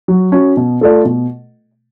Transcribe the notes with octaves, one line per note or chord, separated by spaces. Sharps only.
F#3
C#4 F#4
B2
A3 F4 A4 D5
B2